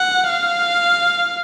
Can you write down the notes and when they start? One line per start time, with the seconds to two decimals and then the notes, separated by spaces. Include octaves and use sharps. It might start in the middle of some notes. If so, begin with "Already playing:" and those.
Already playing: F#5
0.29 F5